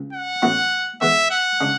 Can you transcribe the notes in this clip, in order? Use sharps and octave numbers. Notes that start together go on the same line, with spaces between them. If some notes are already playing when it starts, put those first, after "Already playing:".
Already playing: C#2
F#5
A1 A2 F#3 B3 E4
E3 G#3 B3 E5
F#5
C#3 G#3 D4